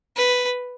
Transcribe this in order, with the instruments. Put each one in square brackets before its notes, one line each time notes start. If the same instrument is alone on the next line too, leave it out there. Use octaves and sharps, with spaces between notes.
[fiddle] B4